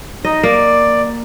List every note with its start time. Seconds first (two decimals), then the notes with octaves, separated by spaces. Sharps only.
0.25 D#4 D#5
0.43 A#3 D5